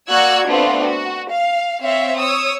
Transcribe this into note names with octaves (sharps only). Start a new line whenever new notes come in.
A#3 F#4 D5 E6 F#6 G#6
A3 B3 C4 D4 F4
F#4
F5
C4 C#5 E5 F5
C#5 D#6 E6